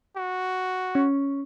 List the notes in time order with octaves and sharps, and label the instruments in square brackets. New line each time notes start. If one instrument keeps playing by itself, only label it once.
[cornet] F#4
[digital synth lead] C#4